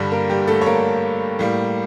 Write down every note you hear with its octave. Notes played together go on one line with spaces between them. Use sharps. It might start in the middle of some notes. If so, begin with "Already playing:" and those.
Already playing: G2 D3 G3
A#3 A#4
G3 G4
A3 A4
C#5
A#3 A#4
A2 G3 A#3